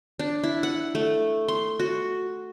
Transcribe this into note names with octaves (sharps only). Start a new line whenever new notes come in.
D4
E4
F#5
A3
C6
F#4